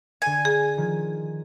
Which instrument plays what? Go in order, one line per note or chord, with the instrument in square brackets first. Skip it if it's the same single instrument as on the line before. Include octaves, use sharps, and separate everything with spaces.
[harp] D3 C#7 [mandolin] G#5
[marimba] G#4
[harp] D#3 F3